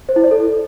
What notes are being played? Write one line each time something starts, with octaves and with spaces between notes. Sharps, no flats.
C5
E4
D5
A4